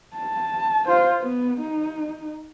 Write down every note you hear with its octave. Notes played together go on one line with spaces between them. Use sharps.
A5
F4 C5
B3
D#4